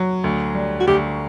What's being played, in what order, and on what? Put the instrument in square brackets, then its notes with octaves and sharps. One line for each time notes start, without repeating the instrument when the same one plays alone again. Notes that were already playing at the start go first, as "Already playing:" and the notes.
Already playing: [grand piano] F#3
D2
G3
[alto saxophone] F#4
[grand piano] D2 [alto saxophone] G4